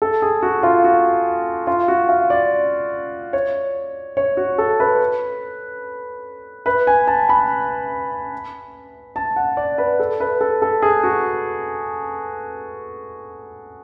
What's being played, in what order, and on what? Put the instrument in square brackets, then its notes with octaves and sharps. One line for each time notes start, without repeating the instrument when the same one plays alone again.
[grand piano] A4
G#4
F#4
F4
F#4
F4
F#4
F5
D5
C#5
C#5
F#4
A4
B4
B4
G#5
A5
B5
A5
F#5
D5
B4
A4
B4
A4
A4
G#4
F#4